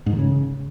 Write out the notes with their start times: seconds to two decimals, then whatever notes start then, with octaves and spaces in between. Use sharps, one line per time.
0.06 G#2
0.13 D#3
0.19 C#3